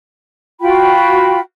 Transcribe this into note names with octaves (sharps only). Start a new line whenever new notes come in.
F4 F#4 G5 B5